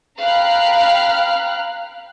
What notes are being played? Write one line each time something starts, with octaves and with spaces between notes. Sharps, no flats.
F5 G5 A#5 B5 F6 F#6